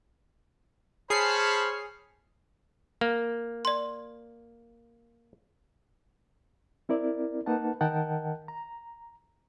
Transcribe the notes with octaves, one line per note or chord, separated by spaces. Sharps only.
G#4 C5 C#5 A5 B5 F6 C7
A#3
D5 C6
C4 E4 A#4 D5
A#3 D#4 B4 F#5 A5
D#3 A#4 D#5 F#5 G5 A5
A#5